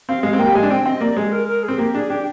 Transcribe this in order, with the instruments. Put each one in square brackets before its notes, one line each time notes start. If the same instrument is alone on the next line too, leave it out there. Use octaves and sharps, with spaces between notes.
[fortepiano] C4 [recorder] F5
[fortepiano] G#3 [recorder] F5
[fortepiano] C4
[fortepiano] A#3 [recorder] G5
[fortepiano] G3
[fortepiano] G#3 [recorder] G#5
[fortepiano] D4
[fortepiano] C4 [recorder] G5
[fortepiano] C4 [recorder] D#5
[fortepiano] A#3 [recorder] D5
[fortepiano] G#3 [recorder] G#4
[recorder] A#4
A#4
G#4
[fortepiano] C4
[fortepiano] A#3 [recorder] G4
[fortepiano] D4 [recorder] G#4
[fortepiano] D4 [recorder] G4